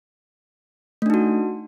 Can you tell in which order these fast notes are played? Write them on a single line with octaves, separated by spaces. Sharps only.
A3 D4 D#4 F#4